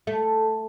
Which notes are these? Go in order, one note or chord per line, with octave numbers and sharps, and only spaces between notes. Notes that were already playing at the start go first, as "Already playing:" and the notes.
A3